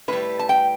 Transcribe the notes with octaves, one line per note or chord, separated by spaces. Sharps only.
A2 G3 B4
A5
G5